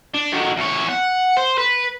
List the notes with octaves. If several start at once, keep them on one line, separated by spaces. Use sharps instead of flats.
D4
D#3 F#3
E2 C#5
F#5
C5
B4